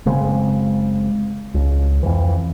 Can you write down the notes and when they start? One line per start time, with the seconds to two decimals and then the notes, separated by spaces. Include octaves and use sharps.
0.05 F#1 C#3 G#3 C4
1.54 C#2
2.03 F2 E3